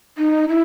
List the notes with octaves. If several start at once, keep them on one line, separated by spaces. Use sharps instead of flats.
D#4
E4